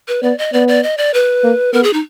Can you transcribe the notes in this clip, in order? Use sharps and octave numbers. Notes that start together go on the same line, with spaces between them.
B4
B3 D5
D#5
B3 D5
D5
D#5
D5
B4
A#3
B3 A#4
G#4
D#4